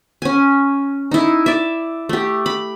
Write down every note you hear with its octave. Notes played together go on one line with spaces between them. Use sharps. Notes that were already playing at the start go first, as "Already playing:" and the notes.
C#4 G#5
D#4 E4
D5 E5
A3 G4
B5